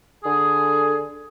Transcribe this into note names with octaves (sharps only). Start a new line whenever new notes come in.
D3 G#4